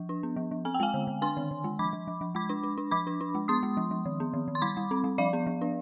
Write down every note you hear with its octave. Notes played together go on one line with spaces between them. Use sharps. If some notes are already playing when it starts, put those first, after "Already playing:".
Already playing: F3
D4
B3
F3
F3
C4 G#5
G5
G#3 F5 G#5
D3
D3
D4 G#5 C6
D#3
D#3
G#3
F3 B5 D6
F3
F3
F3
G#3 B5 D6
D4
D4
D4
F3 B5 D6
D4
D4
G#3
B3 C6 D#6
G#3
F3
F3
D#3
B3
D#3
D#3
C6
G3 B5 D6
G3
C4
G3
F3 D5 F5
B3
F3
D4